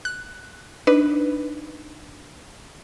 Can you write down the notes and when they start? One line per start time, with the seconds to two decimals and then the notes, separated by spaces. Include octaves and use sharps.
0.05 F#6
0.87 D4 D#4 B4